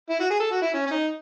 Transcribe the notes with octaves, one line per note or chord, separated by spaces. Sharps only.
E4
F#4
G#4
A4
F#4
E4
C#4
C#4
D#4